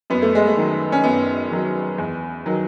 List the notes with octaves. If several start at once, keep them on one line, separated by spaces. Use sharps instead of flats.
F#2 B3
A3
G#3
A3
D#3 F#3
C#4
F#2 B3
D#3 F#3
E2
D#3 F#3